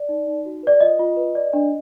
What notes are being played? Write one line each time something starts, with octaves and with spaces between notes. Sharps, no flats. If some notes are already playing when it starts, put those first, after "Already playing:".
Already playing: D5
D#4
D#4
F#4
B4 D5
F4 D#5
F4
B4
D5
D4